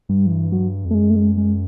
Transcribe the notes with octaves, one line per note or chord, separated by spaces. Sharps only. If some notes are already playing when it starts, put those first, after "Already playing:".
G2 G3
F3
E3
F#3
F2
A3
F#2 G#3
A3
G#3
G#3